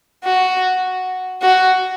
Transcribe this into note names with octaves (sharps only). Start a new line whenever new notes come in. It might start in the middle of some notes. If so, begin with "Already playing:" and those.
F#4
F#4